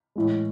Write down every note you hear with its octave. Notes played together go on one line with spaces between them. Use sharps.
A2 E3 G#3